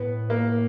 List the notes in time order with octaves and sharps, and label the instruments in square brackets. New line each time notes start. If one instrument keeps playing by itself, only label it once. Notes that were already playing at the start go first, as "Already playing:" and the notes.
Already playing: [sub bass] A2 [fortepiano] B3
[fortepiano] A#3